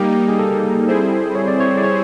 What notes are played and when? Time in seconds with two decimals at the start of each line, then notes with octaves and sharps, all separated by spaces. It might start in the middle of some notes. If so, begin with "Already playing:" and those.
Already playing: G3 A#3 D#4 G4
0.28 G#4
0.39 A4
0.87 G3 C4 E4 G#4 C5
1.35 C#5
1.48 D5
1.60 C#5
1.77 D5
1.84 C#5